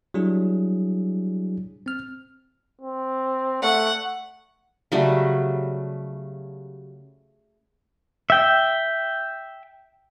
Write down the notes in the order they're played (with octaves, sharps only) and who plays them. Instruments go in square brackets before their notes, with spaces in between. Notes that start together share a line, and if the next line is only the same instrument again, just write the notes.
[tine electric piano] F#3 G3 D4 E4 G#4
C4 F6
[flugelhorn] C4
[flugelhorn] A3 [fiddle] F#5
[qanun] C#3 F#3 G3 A3
[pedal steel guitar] E5 G5